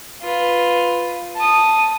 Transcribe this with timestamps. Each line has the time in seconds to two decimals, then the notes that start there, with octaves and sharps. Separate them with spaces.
0.22 F4 B4
1.36 A5 D#6